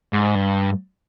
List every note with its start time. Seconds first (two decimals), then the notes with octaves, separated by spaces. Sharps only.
0.13 G#2
0.35 G2